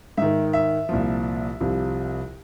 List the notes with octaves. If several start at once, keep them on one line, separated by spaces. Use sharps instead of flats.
G#2 D#3 E5
E5
C2 A#2 F3
C2 C3 F3